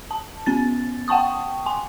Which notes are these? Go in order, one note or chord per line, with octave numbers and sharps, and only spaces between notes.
A5
B3 C#4 A6
F#5 G5 A5 C#6 D#6
G#5 C6